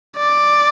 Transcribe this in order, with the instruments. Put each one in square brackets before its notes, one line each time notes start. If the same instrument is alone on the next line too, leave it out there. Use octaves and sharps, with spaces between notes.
[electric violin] D5